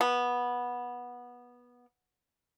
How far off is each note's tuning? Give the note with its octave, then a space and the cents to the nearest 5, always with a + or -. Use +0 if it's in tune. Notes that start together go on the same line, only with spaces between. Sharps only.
B3 -15